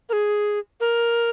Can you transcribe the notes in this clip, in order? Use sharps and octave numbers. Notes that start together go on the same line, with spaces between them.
A#4
G#4
A#4